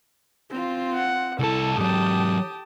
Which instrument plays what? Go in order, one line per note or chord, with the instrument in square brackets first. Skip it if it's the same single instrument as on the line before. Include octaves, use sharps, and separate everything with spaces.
[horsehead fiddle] C4 F4
[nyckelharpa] F#5
[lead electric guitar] C2 A5 [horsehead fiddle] E4 [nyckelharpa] A4
[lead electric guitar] G#2 F#3 [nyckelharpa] G4 D#6 [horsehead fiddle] G5 A5